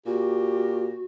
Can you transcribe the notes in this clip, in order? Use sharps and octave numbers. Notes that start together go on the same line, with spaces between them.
A#2 F#4 G4